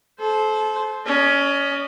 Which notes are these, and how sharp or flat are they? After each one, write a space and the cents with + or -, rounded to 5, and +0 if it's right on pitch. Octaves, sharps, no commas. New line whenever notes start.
A4 -30 C5 +0
C#4 +20 D#5 -35